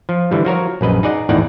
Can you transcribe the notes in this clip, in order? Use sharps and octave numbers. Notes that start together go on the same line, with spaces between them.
F3
D3 E3 G3
F3 F#4 A#4 C#5
A#1 F#2 B4 D#5
D#4 G#4 D5 D#5 F#5
G#1 E2 A2 D#4 D5 F#5